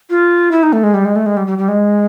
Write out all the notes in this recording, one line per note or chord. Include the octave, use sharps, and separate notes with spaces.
F4
E4
D#4
A3
G#3
G3
G#3
A3
G#3
G3
G3
G3
G#3